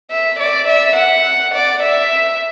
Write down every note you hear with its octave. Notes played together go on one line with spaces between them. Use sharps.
E5
D5
E5
F#5
D5
E5